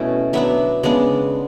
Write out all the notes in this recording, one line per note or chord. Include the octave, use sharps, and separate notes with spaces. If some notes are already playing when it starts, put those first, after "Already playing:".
Already playing: B2 A3 C#4 E4
F#3 B3 D4 E5
C#3 G#3 B3 D4